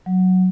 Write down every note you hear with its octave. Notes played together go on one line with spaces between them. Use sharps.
F#3